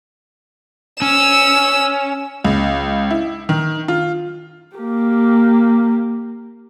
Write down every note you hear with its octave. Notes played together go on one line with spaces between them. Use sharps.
C#4 E6
C#2
E4
D#3
F4
A#3 G4